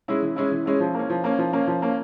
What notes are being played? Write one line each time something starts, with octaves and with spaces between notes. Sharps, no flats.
G#3 C#4 E4
E3
G#3 C#4 E4
E3
G#3 C#4 E4
F3
A#3 C#4
F3
A#3 C#4
F3
A#3 C#4
F3
A#3 C#4